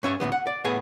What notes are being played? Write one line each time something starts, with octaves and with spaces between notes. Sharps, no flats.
G2 C#4 E5 G#5
D2 A2 E3 B3
F#5
D5
A2 B3 G#4 G#5